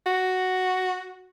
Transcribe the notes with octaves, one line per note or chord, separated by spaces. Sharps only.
F#4